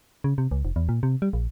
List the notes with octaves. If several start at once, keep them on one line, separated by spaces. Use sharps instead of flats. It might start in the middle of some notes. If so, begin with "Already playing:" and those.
C#3
C3
C#2
F1
E2
A#2
C3
G3
A#1